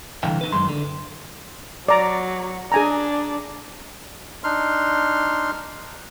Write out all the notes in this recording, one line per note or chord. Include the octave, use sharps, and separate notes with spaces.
C2 D3 E3 F5 G5
D#4 B4
F#2 D#3 G#3 C6
D3
F#3 D5 A#5
D4 G#4 G#5 A#5
D4 D#4 C6 F6